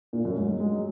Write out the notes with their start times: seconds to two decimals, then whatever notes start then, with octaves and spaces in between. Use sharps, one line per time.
0.13 A#2
0.25 F#2
0.37 G#2
0.49 F#3
0.60 G#3
0.72 F#3